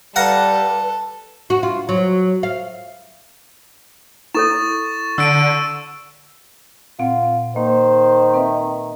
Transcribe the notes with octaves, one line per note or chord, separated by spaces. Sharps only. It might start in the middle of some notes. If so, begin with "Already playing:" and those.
G3 A4 B4 F5 F#5 A#5
F#4
F4
F#3
F5
E4 A4 C#5 C#6 A6 E7
D3 E6 D7 D#7
A#2 C4 F4 F#5
D#3 A#3 C5
C4 B4 E5